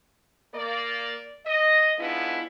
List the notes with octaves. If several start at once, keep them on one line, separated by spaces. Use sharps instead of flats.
A#3 D5
D#5
G#2 B3 D4 E4 F4